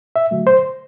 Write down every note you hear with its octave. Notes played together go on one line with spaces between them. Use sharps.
E5
D3 F#3 A3
C5